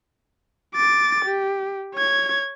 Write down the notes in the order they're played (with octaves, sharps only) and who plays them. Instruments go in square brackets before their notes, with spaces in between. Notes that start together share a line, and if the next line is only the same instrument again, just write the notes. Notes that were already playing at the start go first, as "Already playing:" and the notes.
[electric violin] D6 A6
G4
C#5 G#6